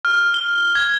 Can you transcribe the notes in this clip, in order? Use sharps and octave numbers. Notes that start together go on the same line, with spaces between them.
F6
G7
G#6